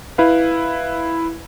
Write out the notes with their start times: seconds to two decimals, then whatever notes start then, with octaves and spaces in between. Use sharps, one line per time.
0.18 E4 B4 F5